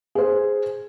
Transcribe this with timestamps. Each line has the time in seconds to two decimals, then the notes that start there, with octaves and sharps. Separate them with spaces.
0.15 G#4 C5